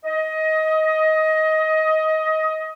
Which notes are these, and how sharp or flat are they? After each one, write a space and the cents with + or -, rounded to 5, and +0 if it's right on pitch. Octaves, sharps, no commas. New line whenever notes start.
D#5 +20